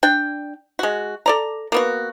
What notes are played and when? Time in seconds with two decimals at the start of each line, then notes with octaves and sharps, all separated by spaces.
0.03 D4 G5
0.79 G#3 F#4
1.26 A4 D5 A#5
1.72 A#3 B3 F#4